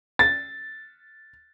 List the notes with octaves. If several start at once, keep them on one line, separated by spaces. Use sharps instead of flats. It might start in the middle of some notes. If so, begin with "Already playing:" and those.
A6